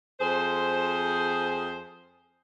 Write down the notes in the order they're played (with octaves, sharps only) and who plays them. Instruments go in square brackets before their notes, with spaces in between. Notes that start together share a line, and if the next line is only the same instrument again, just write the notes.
[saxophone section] F2 G#4 C5